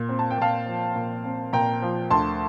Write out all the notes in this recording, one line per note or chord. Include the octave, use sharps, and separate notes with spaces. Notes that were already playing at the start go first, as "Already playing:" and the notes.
Already playing: A#2
C4
A5
G5
A#2 F5 A5
F3
A#2
C4
A#2 G5 A#5
F3
D2 A5 C6